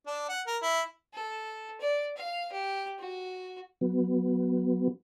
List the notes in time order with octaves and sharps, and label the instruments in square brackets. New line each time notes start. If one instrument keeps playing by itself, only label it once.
[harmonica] D4
F#5
A#4
E4
[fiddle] A4
D5
F5
G4
F#4
[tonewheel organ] F#3 B3